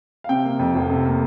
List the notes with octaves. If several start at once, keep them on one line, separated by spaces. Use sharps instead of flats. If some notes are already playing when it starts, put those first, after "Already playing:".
F5
C3 G5
A#3
F2
F1
C3
A#3